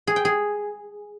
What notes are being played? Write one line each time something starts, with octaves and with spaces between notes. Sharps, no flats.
G#4
G5
G#4